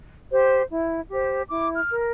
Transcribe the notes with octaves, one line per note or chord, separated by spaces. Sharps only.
G4 C5
E4
G4 C5
E4 D6
F6
A#4